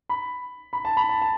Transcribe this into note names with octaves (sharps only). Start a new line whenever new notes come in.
B5
B5
A5
B5
A5
A5